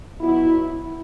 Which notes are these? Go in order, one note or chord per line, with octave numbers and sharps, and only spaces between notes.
B2 F#3 B3 E4
E4